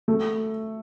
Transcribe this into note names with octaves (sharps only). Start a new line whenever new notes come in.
A3